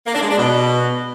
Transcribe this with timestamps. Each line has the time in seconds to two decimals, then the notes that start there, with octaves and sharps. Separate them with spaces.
0.06 A#3
0.14 D4
0.22 G#3
0.30 D4
0.38 B2